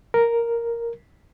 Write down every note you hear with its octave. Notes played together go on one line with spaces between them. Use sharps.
A#4